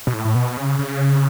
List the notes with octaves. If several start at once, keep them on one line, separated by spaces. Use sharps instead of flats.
B2
A2
A2
B2
C#3
C#3